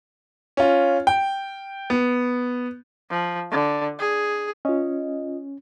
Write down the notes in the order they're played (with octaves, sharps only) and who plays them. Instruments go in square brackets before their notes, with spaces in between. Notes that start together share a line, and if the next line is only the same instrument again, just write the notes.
[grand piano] C#4 F4
G5
B3
[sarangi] F3
D3
G#4
[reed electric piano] C#4 [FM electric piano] F4 D#5